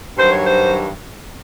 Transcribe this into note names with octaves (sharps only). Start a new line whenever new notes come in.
G2 D#3 F#3 C5
C#5
C5